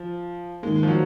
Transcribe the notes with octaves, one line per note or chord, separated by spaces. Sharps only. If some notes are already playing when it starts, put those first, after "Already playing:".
Already playing: F3
G#2 D#3 G#3 A#3
F3
F#3